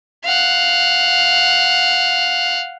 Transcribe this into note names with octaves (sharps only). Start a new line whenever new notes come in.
F5 F#5